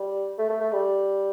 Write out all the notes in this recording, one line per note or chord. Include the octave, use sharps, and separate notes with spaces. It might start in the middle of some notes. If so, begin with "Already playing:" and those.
Already playing: G3
A3
A3
A3
G3